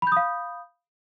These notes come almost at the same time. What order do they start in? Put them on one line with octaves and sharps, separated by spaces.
B5 G6 D#6 F5